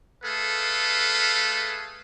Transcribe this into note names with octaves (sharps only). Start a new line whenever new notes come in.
A3 G#4 A4 B4 F5